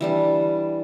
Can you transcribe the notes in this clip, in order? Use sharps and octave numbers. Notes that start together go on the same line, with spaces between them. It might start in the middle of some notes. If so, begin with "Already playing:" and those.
E3 G3 D4